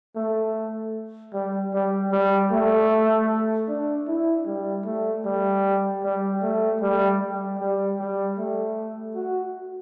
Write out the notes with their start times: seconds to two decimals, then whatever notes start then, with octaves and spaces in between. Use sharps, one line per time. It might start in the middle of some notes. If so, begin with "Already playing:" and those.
0.16 A3
1.34 G3
1.73 G3
2.12 G3
2.52 A3
3.68 D4
4.07 E4
4.47 G3
4.85 A3
5.25 G3
6.04 G3
6.42 A3
6.81 G3
7.20 G3
7.59 G3
7.99 G3
8.38 A3
9.16 F#4